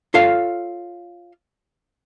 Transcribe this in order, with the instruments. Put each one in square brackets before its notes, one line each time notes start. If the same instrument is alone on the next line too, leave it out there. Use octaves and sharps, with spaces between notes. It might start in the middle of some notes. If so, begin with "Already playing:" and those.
[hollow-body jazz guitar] F4 A4 C#5 F5